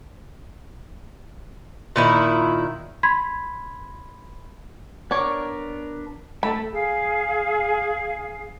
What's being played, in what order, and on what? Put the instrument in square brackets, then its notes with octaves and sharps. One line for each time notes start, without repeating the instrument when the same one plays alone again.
[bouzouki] A#2 D#3 E4
[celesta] B5 C6 G#6 B6
[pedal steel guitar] B3 D4 A#4 [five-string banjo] C#5 D5
[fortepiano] A3 [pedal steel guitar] E4 A5 [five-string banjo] B5
[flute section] G#4 F5